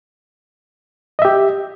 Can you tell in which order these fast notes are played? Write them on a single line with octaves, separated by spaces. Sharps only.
D#5 E5 G4